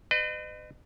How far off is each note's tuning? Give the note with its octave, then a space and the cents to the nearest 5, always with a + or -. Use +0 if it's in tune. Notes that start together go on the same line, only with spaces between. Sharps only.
B4 +40 D#5 -35